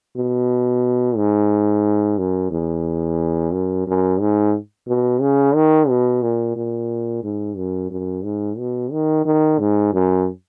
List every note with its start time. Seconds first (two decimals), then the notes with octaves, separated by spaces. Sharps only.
0.17 B2
1.17 G#2
2.18 F#2
2.51 E2
3.53 F#2
3.87 F#2
4.20 G#2
4.88 B2
5.21 C#3
5.55 D#3
5.89 B2
6.22 A#2
6.56 A#2
7.23 G#2
7.57 F#2
7.91 F#2
8.24 G#2
8.58 B2
8.92 D#3
9.25 D#3
9.59 G#2
9.93 F#2